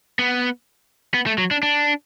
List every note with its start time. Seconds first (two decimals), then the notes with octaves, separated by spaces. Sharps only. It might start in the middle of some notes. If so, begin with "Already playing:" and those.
0.19 B3
1.14 B3
1.26 A3
1.38 F#3
1.51 D4
1.63 D4